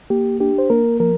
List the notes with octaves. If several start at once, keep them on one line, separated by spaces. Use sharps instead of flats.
A#3 G4
D4 G4
C5
A#3 A#4
F3 A#4